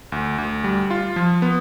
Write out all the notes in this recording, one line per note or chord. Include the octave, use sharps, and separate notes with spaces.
D2
D2
G3
F4
F3
B3